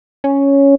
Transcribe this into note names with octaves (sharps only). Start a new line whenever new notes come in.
C#4